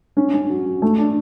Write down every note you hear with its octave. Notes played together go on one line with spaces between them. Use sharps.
C#4
C#4
F#3
F#3
A3
D4